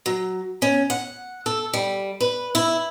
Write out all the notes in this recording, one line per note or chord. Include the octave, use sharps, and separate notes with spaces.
F#3
C#4
F#5
A4
G3
B4
E4